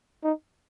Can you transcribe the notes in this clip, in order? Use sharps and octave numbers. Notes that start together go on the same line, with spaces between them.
D#4